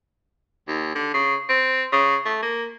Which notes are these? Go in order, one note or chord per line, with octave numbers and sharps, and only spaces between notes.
D#2
D3
C#3
C4
C#3
A3
A#3